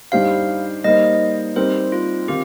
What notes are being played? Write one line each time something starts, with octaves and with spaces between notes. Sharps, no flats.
G2 G3 D#4 G4 C5 F5
G3 A#3 D#4 C5 D#5
G3 C4 D#4 G4 A#4 C5
F4
D#3 C4 F4 G4